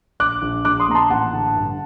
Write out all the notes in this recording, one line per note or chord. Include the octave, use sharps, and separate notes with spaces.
A#1 D6 F#6
A#1
A#1 D6 F#6
C6 D#6
A#2 A#5
A5 C6
A1 F#5 A5
D3
G2